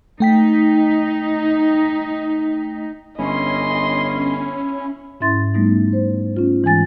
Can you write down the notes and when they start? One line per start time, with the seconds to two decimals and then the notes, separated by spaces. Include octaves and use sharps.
0.20 A3 D#4 G5 B6
3.18 G1 C#4 E4 D#5 C6
5.21 G#2 C#4 E4 E5 C6 A6
5.54 G3 A3 B3 D#4
5.93 C5
6.37 C#4 F4
6.63 G#2 E3 G#3 G#5 A6